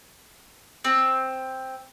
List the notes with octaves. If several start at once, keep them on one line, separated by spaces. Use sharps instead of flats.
C4